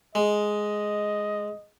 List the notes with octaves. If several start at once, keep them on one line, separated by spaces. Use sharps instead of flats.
G#3 D#5